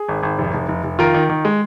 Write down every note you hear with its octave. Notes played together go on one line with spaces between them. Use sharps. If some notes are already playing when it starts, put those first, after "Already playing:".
Already playing: G#4
G#1
G#1
F1
F1
F1
F1
D#3 F4 A#4
D#3
D#3
G#3